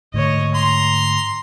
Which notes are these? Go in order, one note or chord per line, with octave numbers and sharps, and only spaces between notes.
G#2 D3 A3 C#5 D#5
A#5 C6